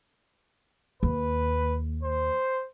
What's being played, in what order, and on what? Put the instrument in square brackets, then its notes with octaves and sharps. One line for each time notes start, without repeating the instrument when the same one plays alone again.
[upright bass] D#2 [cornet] B4
[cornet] C5